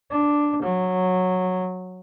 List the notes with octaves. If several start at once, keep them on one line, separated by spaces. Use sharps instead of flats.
D4
F#3